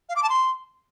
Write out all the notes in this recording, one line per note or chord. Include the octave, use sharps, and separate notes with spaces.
F5
D6
A5
C6